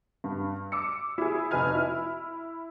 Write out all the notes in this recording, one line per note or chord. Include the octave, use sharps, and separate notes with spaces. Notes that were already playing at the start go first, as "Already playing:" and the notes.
G2
D6 E6 C#7
E4 G#4
F1 D#4 B4 G#5 F6
E4 E5